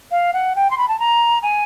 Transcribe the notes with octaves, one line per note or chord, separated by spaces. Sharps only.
F5
F#5
G5
C6
B5
A5
A#5
G#5